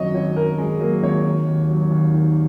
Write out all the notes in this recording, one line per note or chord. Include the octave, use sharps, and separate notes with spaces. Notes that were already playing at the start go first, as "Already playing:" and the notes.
Already playing: G#1 F#2 F#3 C#5 D#5
G#1 C#5
F#2 A#4
G#1 G#3
F#3 A#3
G#1 C#5
D#3
D#2
F#3
D#2
D#3